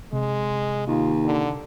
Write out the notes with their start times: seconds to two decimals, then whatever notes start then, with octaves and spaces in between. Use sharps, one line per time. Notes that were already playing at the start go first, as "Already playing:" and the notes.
0.13 C3 G#3
0.88 D#2 F4
1.26 D3